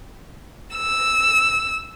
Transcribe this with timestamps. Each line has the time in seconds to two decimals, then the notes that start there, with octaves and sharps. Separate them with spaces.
0.75 E6